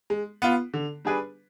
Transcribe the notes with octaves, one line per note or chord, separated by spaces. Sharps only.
G#3
B3 F4
D3
G3 D4 G#4 B4